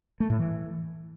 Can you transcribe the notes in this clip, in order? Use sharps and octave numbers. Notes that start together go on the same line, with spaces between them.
A3
A2
E3